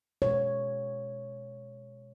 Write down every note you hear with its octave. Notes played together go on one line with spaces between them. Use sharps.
B2 G#3 C#5